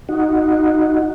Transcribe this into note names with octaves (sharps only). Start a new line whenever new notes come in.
D#4 F#4